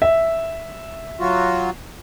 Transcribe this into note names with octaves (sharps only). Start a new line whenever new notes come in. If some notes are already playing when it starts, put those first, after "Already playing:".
E5
F#3 F4 F#4